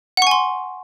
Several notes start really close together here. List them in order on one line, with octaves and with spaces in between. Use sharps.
F#5 C#6 G#5 C6